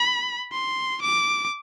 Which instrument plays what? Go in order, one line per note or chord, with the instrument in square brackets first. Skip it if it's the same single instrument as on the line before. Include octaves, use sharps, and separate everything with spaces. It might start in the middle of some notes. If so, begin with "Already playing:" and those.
Already playing: [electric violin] B5
C6
D6